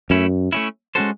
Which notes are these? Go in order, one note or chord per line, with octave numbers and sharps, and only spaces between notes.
F#2 A3 C#4 E4
A3 C#4 E4
G#3 C#4 F#4 A4 C5